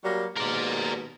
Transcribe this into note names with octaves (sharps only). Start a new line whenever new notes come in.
F#3 G3 A#3
D#2 G#2 B2 A#4 D5